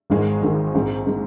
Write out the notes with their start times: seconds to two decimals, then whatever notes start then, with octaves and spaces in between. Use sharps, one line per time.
0.10 G#1 G#2 D#3 G#3
0.42 G#1 G#2 D#3 G#3
0.74 A#1 G#2 G#3 C4
1.07 G#3 C4